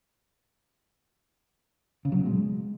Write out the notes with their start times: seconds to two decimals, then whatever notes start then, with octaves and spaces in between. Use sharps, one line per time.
2.05 C#3
2.12 F#3
2.19 B2
2.26 G#3